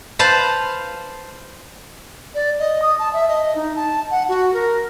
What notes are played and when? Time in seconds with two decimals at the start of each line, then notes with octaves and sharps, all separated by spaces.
0.19 B4 C5 F5 A5
2.35 D5
2.59 D#5
2.82 D#6
2.99 A5
3.13 E5
3.29 D#5
3.55 D#4
3.76 A5
4.11 F#5
4.29 F#4
4.54 A#4